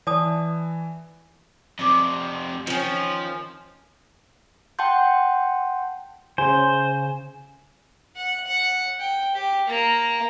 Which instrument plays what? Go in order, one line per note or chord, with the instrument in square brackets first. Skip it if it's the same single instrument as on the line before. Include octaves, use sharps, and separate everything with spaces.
[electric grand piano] E3 [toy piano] D5 A5 D#6
[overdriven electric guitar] F2 C3 [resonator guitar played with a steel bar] C5 D5
[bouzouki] D#3 C#4 [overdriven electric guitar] F3
[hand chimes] F#5 G5 A5 C6 G6
[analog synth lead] C#3 [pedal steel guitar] C5 [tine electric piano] G#5
[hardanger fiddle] F#5
F#5
G5
G4
A#3 A#5